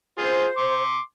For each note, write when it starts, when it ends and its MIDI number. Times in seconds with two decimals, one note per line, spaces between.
0.18 0.45 65
0.18 0.45 68
0.18 0.83 72
0.57 0.99 84
0.57 0.99 86